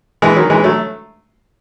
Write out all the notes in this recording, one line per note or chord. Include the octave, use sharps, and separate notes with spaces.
E3 G#3
D#3 F#3
E3 G#3
F#3 A3